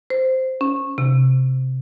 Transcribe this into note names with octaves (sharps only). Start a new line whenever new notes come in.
C5
C#4
C3